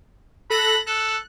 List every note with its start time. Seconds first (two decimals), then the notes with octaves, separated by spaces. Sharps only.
0.50 A4 B5 F#6 A#6
0.87 A4 F#6